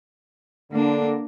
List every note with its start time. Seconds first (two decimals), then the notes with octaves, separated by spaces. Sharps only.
0.71 D3 A#3 D4